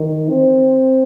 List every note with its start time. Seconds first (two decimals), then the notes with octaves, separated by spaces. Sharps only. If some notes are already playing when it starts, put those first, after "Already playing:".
Already playing: D#3
0.29 C4